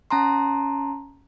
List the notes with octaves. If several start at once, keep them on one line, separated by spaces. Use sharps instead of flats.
C#4 A5 A#5 C6